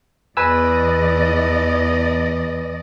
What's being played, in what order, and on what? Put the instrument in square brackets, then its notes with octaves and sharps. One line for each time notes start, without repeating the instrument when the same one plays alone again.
[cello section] E2 D5 D#5 [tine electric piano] B4 G#5 E6